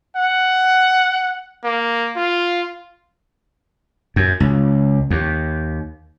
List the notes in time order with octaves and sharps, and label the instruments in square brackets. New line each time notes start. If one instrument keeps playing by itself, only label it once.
[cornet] F#5
A#3
F4
[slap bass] F#2
C#2
D#2